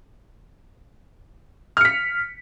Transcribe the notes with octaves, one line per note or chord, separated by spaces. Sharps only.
F6 B6 C#7